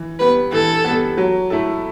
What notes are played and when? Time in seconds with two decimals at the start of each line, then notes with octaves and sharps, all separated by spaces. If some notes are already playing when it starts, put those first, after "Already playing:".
Already playing: E3
0.19 G3 B3 B4
0.52 E3 A4
0.84 G3 B3
1.17 F#3
1.50 A3 E4 A4